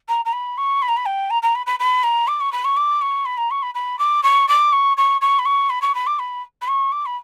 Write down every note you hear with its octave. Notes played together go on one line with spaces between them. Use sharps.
A#5
A#5
B5
C#6
B5
A#5
B5
G5
A#5
A#5
B5
B5
B5
A#5
D6
C#6
B5
C#6
D6
C#6
B5
A#5
C#6
B5
B5
D6
C#6
D6
C#6
C#6
C#6
B5
C#6
B5
C#6
B5
D6
B5
B5
C#6
D6
B5